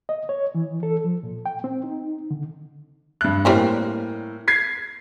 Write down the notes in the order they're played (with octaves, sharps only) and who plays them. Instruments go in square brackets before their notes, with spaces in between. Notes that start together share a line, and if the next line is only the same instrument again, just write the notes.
[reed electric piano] D#5
C#5
E3
A4
F3
A#2
G5
C4
D#4
D3
[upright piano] G2 F#6
[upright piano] A2 A#3 [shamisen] G3 C4 C#4
[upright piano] G#6 B6 C7